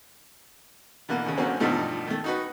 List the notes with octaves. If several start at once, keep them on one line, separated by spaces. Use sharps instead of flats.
B2 D3 E3 A#3
D#2 C#3
F#2 D3 F#3 A#3 C4 C#4
E2 G2 B2 F3 A3 D#4
D#3 A3
D#4 F#4 B4